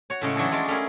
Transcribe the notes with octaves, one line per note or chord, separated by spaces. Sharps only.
F#4 C#5
A2 C#3 G#3
E3 F#3 D4 F#4 G#4 A4
F#3 G#3 F4 D5
A3 C#4 E4 G#4 A#4